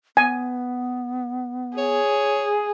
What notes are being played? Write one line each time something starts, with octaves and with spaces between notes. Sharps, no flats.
B3 G#5
G#4 C#5